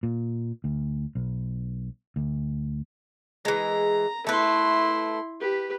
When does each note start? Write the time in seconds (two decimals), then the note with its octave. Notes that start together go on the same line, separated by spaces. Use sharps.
0.03 A#2
0.64 D2
1.15 B1
2.16 D2
3.45 E3 G#3 A#5
4.27 A3 E4 B4 C6
5.41 G4 B4